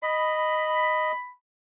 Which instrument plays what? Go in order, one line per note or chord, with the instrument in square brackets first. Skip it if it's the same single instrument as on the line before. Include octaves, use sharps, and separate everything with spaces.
[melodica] D#5 [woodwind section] B5